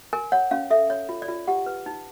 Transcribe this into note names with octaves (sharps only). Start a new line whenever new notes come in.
A#4 G#5
C#5 F#5
C#4 F5
A4 E5
C#5
F4
D5
F4
G4 F#5
B4
D#4